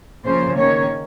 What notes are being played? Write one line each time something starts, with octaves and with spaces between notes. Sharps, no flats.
C#3 F3 A#3 C#4 C5
D#3 A#3 C#4 C#5